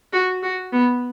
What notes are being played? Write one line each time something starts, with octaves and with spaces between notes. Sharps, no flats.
F#4
F#4
B3